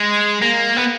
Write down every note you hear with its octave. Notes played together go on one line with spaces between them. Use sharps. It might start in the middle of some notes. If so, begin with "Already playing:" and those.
Already playing: G#3
A#3
B3